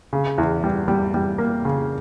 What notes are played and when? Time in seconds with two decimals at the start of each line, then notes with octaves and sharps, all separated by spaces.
0.13 C#3
0.38 E2
0.64 G3
0.88 G3
1.14 G3
1.38 A#3
1.65 C#3